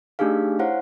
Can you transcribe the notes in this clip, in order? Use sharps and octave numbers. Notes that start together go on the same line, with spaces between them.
A3 D4 D#4 G4 G#4 F5
E4 C5 C#5 F5 F#5